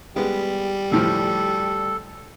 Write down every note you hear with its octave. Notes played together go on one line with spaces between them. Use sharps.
G3 G#3 B3
D2 A2 F3 A4